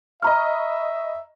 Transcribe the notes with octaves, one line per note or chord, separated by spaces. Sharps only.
D#5 E5 A#5 B5 C#6 F6